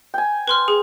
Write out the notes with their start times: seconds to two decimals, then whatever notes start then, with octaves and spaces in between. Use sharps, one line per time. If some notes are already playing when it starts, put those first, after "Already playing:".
0.14 G5 G#5
0.48 B4 C6 F6
0.68 G#4